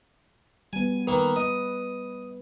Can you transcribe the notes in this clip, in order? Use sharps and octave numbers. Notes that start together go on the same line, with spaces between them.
G3 B3 G#5
D#3 A#3 B4
D#5